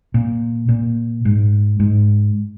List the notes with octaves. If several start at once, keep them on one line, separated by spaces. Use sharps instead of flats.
A#2
A#2
G#2
G#2